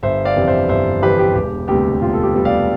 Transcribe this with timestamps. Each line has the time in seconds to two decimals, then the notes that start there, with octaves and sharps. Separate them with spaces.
0.03 G1 C5 E5
0.25 D5 F5
0.36 F2 C3 E3
0.48 C5 E5
0.69 G1 C5 E5
1.02 F2 C3 E3 G4 B4
1.19 G4
1.35 E1 G4
1.68 D2 C3 G3 B3 G4
2.01 E1 F4
2.13 A4
2.23 G4
2.34 D2 C3 G3 B3
2.45 D5 F5